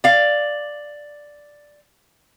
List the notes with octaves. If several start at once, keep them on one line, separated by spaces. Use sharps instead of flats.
D5 F5